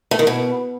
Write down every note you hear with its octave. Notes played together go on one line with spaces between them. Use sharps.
A3
D#3
B2